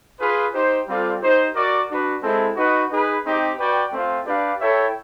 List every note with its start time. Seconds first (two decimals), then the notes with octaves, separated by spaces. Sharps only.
0.20 F4 G#4 B4
0.53 D#4 G4 C5
0.87 G3 C4 F4 A4 D5
1.21 D#4 G4 C5
1.55 F#4 A#4 D5
1.89 D4 F#4 B4
2.22 G#3 C4 E4 A4
2.56 D#4 F#4 B4 D#5 F#5
2.90 D#4 G#4 B4
3.24 C4 D#4 G4
3.58 F#4 B4 D5 G5
3.92 A3 C4 F4
4.25 D4 G4 B4 D5 F5
4.60 E4 A4 C#5 E5 G5